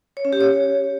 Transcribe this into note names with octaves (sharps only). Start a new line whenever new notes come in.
C#5
C#4
G4
C#5